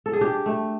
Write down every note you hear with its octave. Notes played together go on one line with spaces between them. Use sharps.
A4
G#4
D4 G4
A3